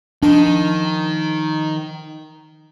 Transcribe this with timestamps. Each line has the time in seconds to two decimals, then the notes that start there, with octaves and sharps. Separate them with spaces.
0.23 D#3 F3 D4 D#5 C6